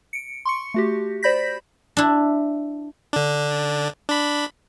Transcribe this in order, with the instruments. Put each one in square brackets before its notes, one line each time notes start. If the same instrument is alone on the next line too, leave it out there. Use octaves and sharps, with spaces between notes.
[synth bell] C#7 D7
C6 C#6 C#7
A3 F#4 G4
C5 D5 B5 G6 A#6 B6
[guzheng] D4 E4
[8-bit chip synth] D3 D4
D4 B5